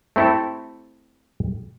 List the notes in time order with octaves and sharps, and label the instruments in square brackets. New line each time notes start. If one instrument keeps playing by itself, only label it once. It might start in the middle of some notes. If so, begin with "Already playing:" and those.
[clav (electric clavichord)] A3 C4 E4 G4 A4